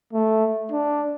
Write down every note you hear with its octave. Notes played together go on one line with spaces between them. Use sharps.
A3
D4